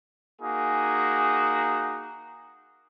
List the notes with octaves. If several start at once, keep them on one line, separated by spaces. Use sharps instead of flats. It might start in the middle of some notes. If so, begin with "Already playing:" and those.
A#3 D#4 F#4 G#4